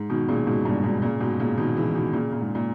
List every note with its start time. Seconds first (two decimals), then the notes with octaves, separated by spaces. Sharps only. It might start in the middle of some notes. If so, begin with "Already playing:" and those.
Already playing: G#2
0.10 B2 D#3
0.28 A#2 C#3
0.47 G#2 B2
0.65 G2 A#2
0.84 G#2 B2
1.02 A#2 C#3
1.20 G#2 B2
1.40 A#2 C#3
1.58 B2 D#3
1.77 C#3 E3
1.95 B2 D#3
2.13 A#2 C#3
2.33 A#2
2.41 G#2
2.55 A#2